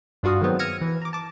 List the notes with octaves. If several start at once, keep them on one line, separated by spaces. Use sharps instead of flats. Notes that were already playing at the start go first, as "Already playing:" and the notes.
G2 D4 F4 F#4 F5 D#6
D#3 F#3 G#3 B3 C4
E6 F6 G#6 A#6 C#7 D#7
E3
A#5 D6
A5 D6